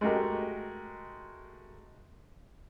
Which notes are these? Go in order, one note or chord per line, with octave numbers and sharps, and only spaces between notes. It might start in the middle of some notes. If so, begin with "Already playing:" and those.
G#3 A3 F#4 G4 A#4